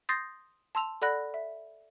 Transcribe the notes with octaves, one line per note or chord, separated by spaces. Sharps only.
C6 D#6 G6 A6 A#6 C7
A5 C6 E6 F7
A4 D5 F#5 B5 F#6 A#6
E5